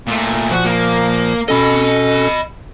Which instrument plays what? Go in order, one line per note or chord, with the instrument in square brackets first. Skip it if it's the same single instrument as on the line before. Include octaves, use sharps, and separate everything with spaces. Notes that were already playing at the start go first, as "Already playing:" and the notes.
[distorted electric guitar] A#2 A3
[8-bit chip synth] A#2 F3 [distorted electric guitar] F#4
[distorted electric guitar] A#3
[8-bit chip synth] B2 C#4 A4 [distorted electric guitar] D#5 B5